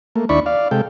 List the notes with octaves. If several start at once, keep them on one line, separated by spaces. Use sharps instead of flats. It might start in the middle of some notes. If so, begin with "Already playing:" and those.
A3 A#3
D#2 D4 E4 D5 B5 C#6
D5 F5
C3 G#3 A4 G5